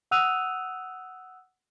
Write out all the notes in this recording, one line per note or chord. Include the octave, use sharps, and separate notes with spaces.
F#5 D#6 E6 F#6 D#7 F7